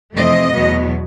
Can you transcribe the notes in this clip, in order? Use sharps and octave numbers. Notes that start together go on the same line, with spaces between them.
F2 C3 E3 A3 C4 D#5
E2 B2 F#3 B3